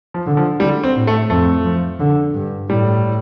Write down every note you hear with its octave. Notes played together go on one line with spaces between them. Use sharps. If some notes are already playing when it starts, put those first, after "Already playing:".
F3
D3
F3
D3 G3
C4
A2
A3
F2 A3
F3
D3
G2
A2 G3